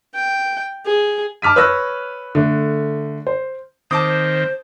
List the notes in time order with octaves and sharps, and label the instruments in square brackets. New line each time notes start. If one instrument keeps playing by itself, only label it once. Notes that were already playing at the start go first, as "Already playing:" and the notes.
[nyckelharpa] G5
G#4
[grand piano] A5 D6 F6 B6 D#7
B4 C#5 E6 F#6 A#6
D3 A3
C5
[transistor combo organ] D#3 C4 [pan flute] C5 [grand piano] A5 D6 D#6